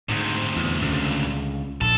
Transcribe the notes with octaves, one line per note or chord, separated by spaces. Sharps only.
D2 G#2 C3
E2
C#2 D3
A#1 A4